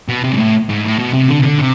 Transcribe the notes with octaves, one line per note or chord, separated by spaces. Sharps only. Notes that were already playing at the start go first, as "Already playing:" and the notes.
B2
C3
G#2
A2
G#2
A2
B2
C3
D3
C3
D3
C3